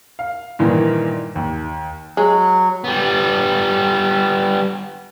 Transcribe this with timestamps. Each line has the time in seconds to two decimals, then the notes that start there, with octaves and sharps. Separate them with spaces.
0.19 F5
0.59 G2 A#2 D#3 E3
1.36 D#2
2.17 F#3 G#3
2.84 G3 B3